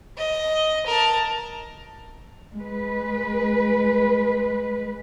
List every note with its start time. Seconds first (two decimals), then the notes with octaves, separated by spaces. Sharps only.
0.18 D#5
0.87 A#4 A5
2.54 G#3 B4